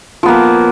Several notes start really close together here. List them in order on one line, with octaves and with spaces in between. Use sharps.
F3 B3 A#3